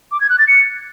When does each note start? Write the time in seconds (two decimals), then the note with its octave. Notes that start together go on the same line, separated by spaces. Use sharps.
0.12 D6
0.21 G#6
0.30 F#6
0.39 A6
0.48 C#7